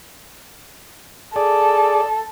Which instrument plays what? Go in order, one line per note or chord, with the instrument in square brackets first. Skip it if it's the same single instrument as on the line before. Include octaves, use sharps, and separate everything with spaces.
[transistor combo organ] G#4 D5 [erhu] A4